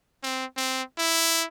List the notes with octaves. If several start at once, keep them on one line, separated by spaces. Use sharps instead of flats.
C4
C4
E4